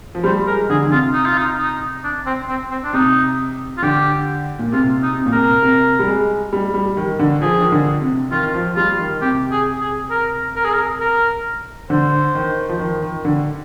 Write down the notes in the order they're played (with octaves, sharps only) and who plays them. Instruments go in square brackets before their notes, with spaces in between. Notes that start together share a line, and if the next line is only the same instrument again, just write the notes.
[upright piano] F3
[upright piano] G3 [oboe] C5
[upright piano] G#3 [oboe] A#4
[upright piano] D3 [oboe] G#4
[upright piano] D3
[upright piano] C3 [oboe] F4
[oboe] D#4
F4
D#4
D#4
D4
C4
C4
C4
D4
[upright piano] C3 [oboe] D#4
[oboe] F4
[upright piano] D3 [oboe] G4
[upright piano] A#2
[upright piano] C3 [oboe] F4
[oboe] D#4
[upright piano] C3
A#2
[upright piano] C3 [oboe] A#4
[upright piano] C3
G3
G#3
G3
G3
D#3
D3
[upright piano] F3 [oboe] G#4
[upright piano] D#3
D3
C3
[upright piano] D#3 [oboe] F4
[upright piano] F3
[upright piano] G3 [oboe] F4
[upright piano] D#3
[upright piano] C3 [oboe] G4
[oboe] G#4
G#4
A#4
A#4
G#4
A#4
A#4
[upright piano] D3 [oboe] C5
[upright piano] D#3
F3
D#3
D#3
D3